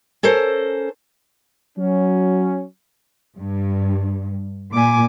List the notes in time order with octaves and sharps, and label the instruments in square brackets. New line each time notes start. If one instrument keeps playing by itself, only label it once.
[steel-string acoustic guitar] C#4 A4 A#4 C5
[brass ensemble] F#3 C#4
[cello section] G2
[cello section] A#2 [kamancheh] G#5 D6